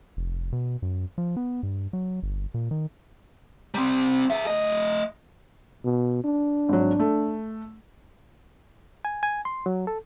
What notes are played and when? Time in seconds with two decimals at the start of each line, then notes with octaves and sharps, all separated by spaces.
0.17 F1
0.52 B2
0.82 F#2
1.18 F3
1.37 B3
1.63 G2
1.93 F#3
2.23 G1
2.54 A#2
2.71 D#3
3.74 G3 C4
4.30 G#4 E5
4.47 A3 D#5
5.85 B2
6.25 D4
6.69 G#1 F#3
7.00 A3
9.05 G#5
9.23 G#5
9.45 C6
9.66 F#3
9.87 A4